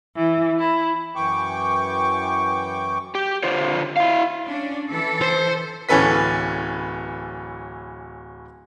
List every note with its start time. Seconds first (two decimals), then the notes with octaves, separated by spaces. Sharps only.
0.16 E3
0.59 E4
1.15 F#2 E3 G5 C#6 D6
3.15 G4
3.43 D3 F4 C5 C#5
3.97 E4 F5
4.46 C#4 D4
4.90 E3 A4
5.21 C5
5.89 D1 E3 C#4 A4 B4 B6